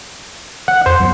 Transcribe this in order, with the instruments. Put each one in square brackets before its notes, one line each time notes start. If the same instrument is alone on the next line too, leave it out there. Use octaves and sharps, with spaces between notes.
[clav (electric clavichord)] F#5
[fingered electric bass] F2 [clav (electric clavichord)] C5
[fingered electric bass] F#2 F#3 B3